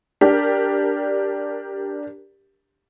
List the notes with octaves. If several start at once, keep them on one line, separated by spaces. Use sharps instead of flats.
D4 G4 A#4